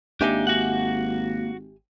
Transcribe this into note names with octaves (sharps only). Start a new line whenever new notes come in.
G#1 A#3 D4 D#4 G4 E5 G#5
F#4 F#5